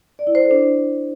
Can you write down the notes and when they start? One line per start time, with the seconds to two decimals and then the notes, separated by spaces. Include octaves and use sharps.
0.19 D5
0.27 E4
0.35 C5
0.43 A4
0.51 D4